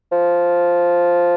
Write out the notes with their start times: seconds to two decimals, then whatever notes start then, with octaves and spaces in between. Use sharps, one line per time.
0.12 F3